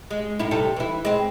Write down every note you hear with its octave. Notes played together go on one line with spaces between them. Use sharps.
G#3
F#2 A2 E4
C3 G3 A4
E3 E4
G#3 C4